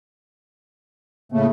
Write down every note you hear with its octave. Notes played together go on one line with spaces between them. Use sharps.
A2 C#3 A3 A#3